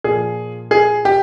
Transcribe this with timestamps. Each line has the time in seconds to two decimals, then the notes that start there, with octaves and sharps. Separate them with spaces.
0.04 A#2 F3 G#4
0.71 G#4
1.05 G4